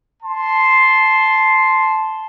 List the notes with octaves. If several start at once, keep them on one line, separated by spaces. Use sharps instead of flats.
A5 C6